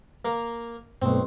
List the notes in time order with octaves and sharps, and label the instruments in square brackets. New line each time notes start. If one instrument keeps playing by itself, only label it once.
[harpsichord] A#3 A#4 F5
[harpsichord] B1 C4 [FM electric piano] G2 B2 A3